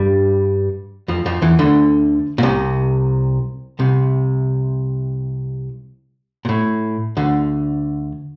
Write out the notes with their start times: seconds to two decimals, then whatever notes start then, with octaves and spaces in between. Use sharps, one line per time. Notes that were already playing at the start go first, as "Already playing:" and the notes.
Already playing: G2 G3
1.08 F2 F3
1.26 F2 F3
1.42 E2 E3
1.59 D2 D3
2.38 A#2
2.43 C2 C3
3.79 C2 C3
6.45 A#2
6.49 A2
7.17 D2 D3